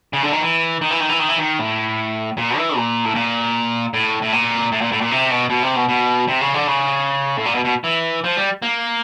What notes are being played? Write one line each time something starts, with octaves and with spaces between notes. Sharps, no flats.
C#3
D3
D#3
E3
D#3
E3
D#3
E3
D#3
E3
D#3
A2
A#2
E3
A#2
A2
A#2
A2
A2
A#2
A2
A#2
A2
A#2
C3
B2
B2
C3
B2
B2
C3
C#3
D3
C#3
A2
A#2
B2
B2
E3
F3
G3
A#3